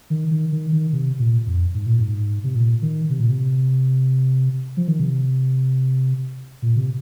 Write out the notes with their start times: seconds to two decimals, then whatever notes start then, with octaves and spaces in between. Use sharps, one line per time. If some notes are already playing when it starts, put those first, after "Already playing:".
0.10 D#3
0.31 D#3
0.52 D#3
0.72 D#3
0.93 C3
1.19 A#2
1.47 F2
1.74 G#2
1.86 A#2
1.99 G#2
2.44 C3
2.55 A#2
2.82 D#3
3.10 C3
3.20 A#2
3.30 C3
4.77 F3
4.88 D#3
5.00 C3
6.62 A#2
6.76 C3